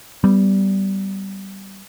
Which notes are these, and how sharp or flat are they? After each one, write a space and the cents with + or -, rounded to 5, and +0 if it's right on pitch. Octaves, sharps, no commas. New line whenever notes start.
G3 -15 B3 +10